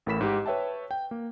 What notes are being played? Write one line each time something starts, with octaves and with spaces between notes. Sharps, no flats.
A1 A2 A#4 B5 B6 E7
G#2 G4
B4 C#5 E5 G5 A5
G5
A#3